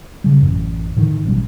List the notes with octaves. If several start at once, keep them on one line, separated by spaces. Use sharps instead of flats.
C#3 G3
A1 F#2
A2 D3 D#3
A1 B2 G3